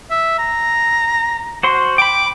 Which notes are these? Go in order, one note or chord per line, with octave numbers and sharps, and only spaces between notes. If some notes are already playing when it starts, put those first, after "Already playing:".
E5
A#5
F#4 C5 C6
G5 B5 D6